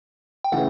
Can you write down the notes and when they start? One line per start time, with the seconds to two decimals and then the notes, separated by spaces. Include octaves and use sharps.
0.44 G5
0.52 C#3 E3 A3 F#5